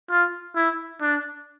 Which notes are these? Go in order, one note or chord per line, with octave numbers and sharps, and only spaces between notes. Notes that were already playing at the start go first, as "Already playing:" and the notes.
F4
E4
D4